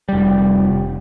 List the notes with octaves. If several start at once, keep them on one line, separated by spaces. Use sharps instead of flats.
F1 G3